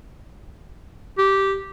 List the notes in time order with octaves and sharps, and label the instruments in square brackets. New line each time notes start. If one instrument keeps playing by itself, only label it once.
[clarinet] G4